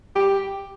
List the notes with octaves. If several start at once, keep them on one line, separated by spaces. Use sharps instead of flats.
G4